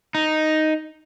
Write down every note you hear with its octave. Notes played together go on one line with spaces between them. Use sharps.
D#4